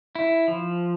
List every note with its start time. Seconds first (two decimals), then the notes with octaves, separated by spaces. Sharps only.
0.15 E4
0.48 F3